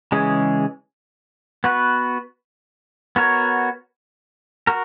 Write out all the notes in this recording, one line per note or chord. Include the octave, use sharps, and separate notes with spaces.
C#3 E3 G#3 C#4 G#4
B3 F#4 B4
B3 F#4 A#4 C#5
F#4 A#4